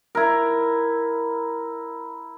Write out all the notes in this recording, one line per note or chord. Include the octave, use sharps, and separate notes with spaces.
E4 A#4